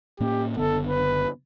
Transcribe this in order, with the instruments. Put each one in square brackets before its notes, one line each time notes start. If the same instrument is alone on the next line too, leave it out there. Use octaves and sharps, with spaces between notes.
[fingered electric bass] A2 A#3 C#4 [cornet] G4
[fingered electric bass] F#1 D3 B3 [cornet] A4
[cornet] B4